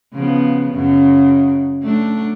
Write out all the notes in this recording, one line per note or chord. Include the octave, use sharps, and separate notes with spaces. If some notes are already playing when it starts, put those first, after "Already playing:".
C#3 F3 B3
F#2 C#3
F#3 A3 D4